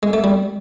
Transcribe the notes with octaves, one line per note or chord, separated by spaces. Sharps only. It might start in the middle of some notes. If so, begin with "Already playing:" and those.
G#3
A3
G3